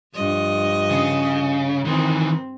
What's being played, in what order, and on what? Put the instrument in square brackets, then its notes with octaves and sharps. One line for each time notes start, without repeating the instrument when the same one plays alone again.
[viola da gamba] G2 F3 D#5
[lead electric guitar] C#3
[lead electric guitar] D#3 E3 [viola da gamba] C4